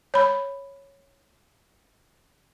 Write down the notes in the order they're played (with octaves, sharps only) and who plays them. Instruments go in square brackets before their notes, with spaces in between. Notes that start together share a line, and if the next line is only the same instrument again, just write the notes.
[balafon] C#5 B5